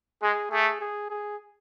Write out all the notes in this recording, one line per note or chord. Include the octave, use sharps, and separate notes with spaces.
G#3 G#4
A3 G#4
G#4
G#4